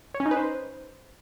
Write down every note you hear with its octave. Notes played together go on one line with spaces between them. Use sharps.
C#5
C#4
D#4
B4
C5